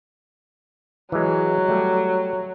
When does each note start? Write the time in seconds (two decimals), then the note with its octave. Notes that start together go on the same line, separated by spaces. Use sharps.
1.12 E3 F#3 G#3
1.68 G3 A3